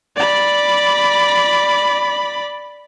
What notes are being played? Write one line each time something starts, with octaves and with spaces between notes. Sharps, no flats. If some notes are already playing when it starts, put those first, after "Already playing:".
D5 B5